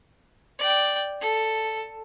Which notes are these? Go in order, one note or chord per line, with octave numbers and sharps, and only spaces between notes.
D5 G5
A4